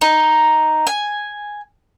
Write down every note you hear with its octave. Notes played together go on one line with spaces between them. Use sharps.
D#4
G#5